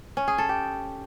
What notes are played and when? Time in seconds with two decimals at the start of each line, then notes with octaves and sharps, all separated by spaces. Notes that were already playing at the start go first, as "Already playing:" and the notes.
0.17 C#4
0.28 G#4
0.38 A4
0.49 G4